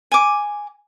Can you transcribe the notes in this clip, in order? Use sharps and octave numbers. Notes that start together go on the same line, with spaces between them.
G#5 D6